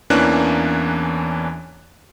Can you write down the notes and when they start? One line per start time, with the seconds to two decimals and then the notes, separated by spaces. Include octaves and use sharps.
0.10 E2 E3 A#3 C#4 D4 F#6